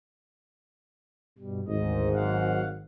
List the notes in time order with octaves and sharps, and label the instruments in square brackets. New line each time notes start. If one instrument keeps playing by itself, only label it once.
[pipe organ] G2 B2 G3
[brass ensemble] G#1 G#2 [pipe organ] D2 D#5
[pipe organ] F#3 F5 F#5